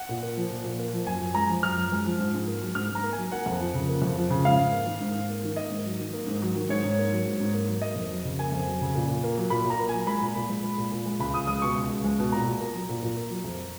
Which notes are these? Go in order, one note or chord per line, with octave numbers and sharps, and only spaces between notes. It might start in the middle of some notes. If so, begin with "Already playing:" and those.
Already playing: F#5
A#2
A#3
F3
A#2
A#2
A#3
F3
F#2 G#5
F#2
G#3 A#5
F3
F#2 F6
F#2
G#3
F3
G#2
G#2
A#3
F#3
G#2 F6
G#2 A#5
A#3
G#5
F#3
A#3 F#5
F2
F3
C#3
A#3
F2
F3
C#3
G#2 F5
G#2
A#3
D#3
G#2
G#2
A#3
D#3
A#3 D#5
G#2
F#3
D#3
A#3
G#2
F#3
D#3
G#2 C#5
G#2
A#3
F#3
G#2
G#2
A#3
F#3
A#3 D#5
F2
F#3
C#3
A#3 G#5
F2
F#3
C#3
A#2
A#2
A#3
F#3
A#2 B5
A#2
A#5
A#3
F#3 G#5
G#3 B5
A#2
A#2
G#3
G#3
A#2
A#2
G#3
C#2 B5
C#2 D#6
G#3 D#6
B2 C#6
C#2
C#2
G#3
B2
A#2 A#5
A#2
A#3
F#3
A#2
A#2
A#3
F#3
F2